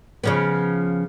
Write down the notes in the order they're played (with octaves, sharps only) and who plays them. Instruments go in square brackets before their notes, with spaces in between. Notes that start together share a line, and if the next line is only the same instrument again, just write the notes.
[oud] C#3 F3 B3